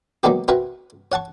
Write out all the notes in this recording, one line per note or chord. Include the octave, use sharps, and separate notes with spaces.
D#3 F#3 G#3 A#3 B3 G4
C4 E4 F#4 A#4 B4
C#5 F#5 A5 C#6